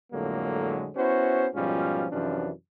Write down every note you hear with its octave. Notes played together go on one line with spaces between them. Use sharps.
F2 A2 D3 F#3 G#3 A#3
B3 C#4 E4 F#4 C5
G#2 B2 F3 G3 C#4 F4
F#2 C3 E3 F3 C#4 D4